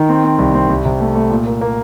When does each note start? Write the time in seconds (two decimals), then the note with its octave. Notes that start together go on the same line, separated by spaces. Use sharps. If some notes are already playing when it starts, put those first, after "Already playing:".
Already playing: D#3
0.09 C4
0.24 C4
0.39 C2
0.54 C4
0.69 C2
0.85 C3
1.00 A3
1.15 A3
1.30 A#2
1.46 A#3
1.61 A#3